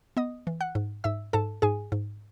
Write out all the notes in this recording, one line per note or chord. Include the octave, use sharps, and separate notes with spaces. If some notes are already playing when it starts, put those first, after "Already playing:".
B3 D#5 D#6
E3
F#5 F#6
G#2
G#2 E5 E6
G#2 A4 A5
G#2 G#4 G#5
G#2